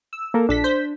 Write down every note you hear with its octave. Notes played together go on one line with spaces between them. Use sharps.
E6
A#3 A4 A#4
A#1 D4 A4 B6
C5 G6 B6